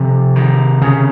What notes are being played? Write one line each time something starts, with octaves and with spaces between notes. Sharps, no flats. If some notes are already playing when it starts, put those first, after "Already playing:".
Already playing: C3 F3
D#3
C#3